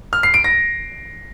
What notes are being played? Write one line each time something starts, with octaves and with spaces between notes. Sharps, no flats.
F6
C7
D7
A#6